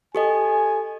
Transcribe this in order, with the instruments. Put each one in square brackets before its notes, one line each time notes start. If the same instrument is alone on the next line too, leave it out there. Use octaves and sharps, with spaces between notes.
[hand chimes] G4 A4 D#5 [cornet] G#5